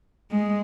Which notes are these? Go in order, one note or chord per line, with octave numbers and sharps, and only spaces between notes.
G#3